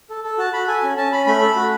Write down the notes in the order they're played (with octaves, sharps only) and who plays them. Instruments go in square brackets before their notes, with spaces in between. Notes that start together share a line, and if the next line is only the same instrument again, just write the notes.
[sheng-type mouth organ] A4
A4
F#4 A5
F#4 B5
A4 G#5
C#4
C#4 A5
C#4 B5
A3 B5
A4
F#4